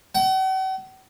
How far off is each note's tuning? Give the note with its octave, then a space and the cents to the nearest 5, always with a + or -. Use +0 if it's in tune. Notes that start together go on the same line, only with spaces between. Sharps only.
F#5 +45